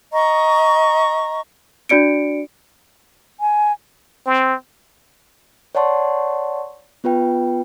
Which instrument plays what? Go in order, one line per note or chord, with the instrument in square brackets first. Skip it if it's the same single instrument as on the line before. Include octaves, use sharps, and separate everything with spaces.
[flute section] D#5 A#5 C#6
[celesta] D4 F#4 D5 C#7 D7
[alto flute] G#5
[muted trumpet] C4
[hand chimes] C#5 D5 F#5 A5 C6 C#6
B3 F4 B4 G5